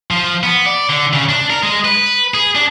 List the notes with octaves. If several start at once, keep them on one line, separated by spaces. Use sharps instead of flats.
F3
B3
D5
D3
C#3
D4
A#4
G#3
B4
G#4
D4